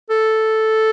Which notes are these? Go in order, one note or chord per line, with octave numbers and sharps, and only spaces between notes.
A4